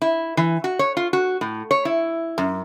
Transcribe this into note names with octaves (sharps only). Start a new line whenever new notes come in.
E4
E3
F#4
C#5
F4
F#4
A2
C#5
E4
F#2